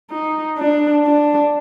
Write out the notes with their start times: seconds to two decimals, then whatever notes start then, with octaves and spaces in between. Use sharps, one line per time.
0.10 D#4
0.58 D4
1.05 D4